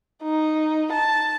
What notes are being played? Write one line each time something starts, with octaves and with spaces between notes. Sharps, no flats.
D#4
A5